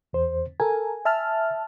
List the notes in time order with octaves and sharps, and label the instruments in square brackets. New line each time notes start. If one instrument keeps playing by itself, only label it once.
[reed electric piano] E2 C5
[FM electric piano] A4 A#4 [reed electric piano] G#5
[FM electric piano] E5 A5 F6